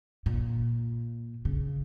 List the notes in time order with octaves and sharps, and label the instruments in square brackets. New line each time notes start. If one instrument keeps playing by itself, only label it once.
[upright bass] A#2
C#3